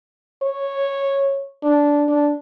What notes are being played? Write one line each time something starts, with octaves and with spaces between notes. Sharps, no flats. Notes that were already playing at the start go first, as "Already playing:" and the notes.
C#5
D4
D4